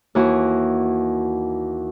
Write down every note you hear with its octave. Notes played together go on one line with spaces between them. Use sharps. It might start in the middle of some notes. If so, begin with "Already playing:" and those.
D#2 E3 F#4